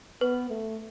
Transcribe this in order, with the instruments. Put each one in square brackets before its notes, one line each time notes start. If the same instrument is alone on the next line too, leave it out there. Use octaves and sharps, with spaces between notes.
[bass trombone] B3 [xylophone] B4
[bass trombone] A3